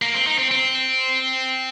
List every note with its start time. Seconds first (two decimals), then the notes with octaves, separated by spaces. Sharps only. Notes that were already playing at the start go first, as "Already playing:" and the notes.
0.02 A#3
0.14 C4
0.27 D#4
0.39 C4
0.51 C4